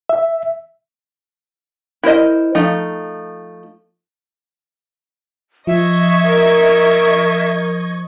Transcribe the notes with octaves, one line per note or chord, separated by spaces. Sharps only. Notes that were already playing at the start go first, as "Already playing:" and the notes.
E5
E4 A#4 C5 D#5
F3 A3 D#4
F3 D#5 E5 C#6 G#6
A#4